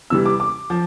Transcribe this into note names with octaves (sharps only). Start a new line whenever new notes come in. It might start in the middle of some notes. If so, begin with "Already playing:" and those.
C3 E3 G3 E6
D6
D6
F3